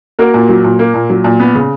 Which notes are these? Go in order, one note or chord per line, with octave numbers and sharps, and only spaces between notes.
A#3 F#4 A#4
A#2
F#3
A#2
A#3
A#2
F#3
A#2
B3
C#3